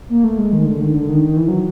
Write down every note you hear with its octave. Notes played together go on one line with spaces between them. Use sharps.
A#3
A3
G#3
D#3
D3
D#3
D3
D#3
D#3
E3
F#3